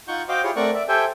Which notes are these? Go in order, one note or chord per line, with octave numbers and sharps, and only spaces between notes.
D#4 F4 F#5 C#6 G6
F#4 C5 D#5 F5 G5 D6
E4 F4 G4 G#4 C#5
A3 C4 A#4 D5 F#5 C#6
D5 E5
G4 A4 C5 E5 G5 G#5